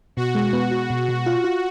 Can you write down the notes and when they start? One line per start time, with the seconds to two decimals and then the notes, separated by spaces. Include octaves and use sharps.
0.17 B2 F#4
0.35 G#3
0.53 B3
0.71 F#4
0.90 B2
1.09 B2
1.26 F4
1.44 F4